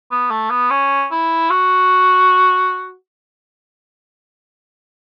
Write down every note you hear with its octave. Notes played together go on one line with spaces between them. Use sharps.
B3
A3
B3
C#4
E4
F#4